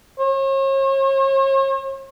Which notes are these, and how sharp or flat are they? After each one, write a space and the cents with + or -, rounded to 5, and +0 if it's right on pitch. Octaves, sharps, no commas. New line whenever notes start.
C#5 -40